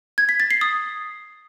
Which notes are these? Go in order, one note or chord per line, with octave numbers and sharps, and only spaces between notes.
G#6
B6
A6
C7
D#6